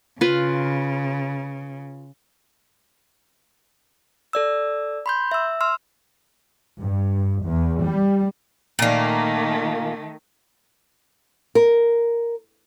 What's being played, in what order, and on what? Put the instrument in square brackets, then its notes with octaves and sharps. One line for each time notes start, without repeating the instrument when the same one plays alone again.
[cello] C#3 [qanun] F4 B4
[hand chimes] A4 D5 E6
B5 C6 G6
E5 E6
C6 E6 F6
[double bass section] G2
E2
G3
[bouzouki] A#2 A#3 [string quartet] D#3 A3
[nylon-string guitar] A#4